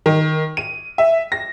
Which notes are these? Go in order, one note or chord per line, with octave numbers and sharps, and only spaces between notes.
D#3
D#7
E5
A#6